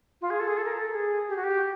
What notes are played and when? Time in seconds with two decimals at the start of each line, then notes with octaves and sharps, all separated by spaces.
0.21 F4
0.30 G#4
0.40 A4
0.48 G#4
0.57 A4
0.65 A#4
0.73 A4
0.93 G#4
1.29 G4
1.36 F#4
1.44 G4